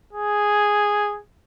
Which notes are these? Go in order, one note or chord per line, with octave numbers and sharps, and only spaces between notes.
G#4